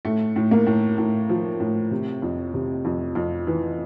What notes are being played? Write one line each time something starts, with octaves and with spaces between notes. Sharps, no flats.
A2 A3
A2
A#3
A2
A2
F3
A2
C3
F2
C3
F2
F2
E3